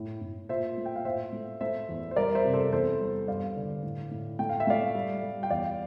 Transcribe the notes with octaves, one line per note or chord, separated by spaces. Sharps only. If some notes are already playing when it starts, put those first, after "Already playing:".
Already playing: A2
A2
A#2 C5 E5
A3
G5
F5
A2 C5 E5
A3
A3 C5 E5
E2
C5
G3 A#4 D5
C5 E5
C3
A4 C5
E2 A4 C5
G3
G2 D5 F5
D3
A2
A2
A3 G5
F5
E5
A3 D5 F5
G3
G3
G5
E2 D5 F5